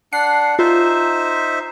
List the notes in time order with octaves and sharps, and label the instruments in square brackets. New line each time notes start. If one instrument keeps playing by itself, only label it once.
[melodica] D4 F#5 [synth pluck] C7
[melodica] D#4 C5 E5 [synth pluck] F4